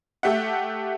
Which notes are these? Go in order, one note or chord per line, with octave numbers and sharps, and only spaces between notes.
A3 G4 E5 F#5